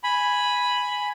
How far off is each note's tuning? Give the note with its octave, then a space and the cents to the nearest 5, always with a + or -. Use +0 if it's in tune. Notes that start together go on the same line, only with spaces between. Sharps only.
G#5 +0 B5 +0